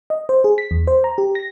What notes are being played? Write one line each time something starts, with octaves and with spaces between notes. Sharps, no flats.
D#5
C5
G#4
B6
E2
C5
A#5
G4
A#6